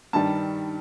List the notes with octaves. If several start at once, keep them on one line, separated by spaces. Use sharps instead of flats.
G2 D#3 G3 A5